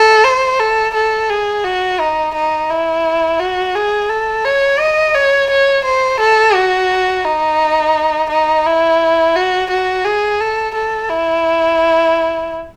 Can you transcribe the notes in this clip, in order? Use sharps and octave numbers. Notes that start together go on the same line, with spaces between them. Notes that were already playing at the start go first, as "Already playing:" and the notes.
Already playing: A4
C5
A4
A4
G#4
F#4
D#4
D#4
E4
F#4
G#4
A4
C#5
D#5
C#5
C#5
C5
A4
F#4
D#4
D#4
E4
F#4
F#4
G#4
A4
A4
E4